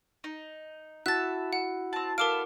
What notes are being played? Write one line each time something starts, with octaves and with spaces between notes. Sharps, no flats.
D#4
E4 F#4 E5 A5 F#6 A6
F#5
C4 A5
B3 A4 A#4 F5 D6 D7